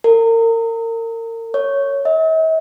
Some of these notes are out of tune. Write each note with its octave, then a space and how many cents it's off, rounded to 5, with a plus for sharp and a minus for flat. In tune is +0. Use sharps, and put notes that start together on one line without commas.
A#4 -35
C#5 +5
E5 -45